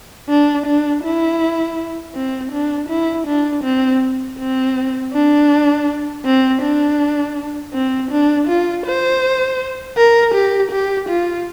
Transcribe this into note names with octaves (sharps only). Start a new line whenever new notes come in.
D4
D4
E4
C4
D4
E4
D4
C4
C4
D4
C4
D4
C4
D4
F4
C5
A#4
G4
G4
F4